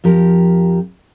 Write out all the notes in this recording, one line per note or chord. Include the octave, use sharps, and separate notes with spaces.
F2 F3 G4 A#4